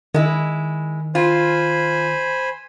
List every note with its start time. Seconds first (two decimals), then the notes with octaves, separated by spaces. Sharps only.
0.14 D#3 G#3 E4
1.15 F4 C5 G#5 B5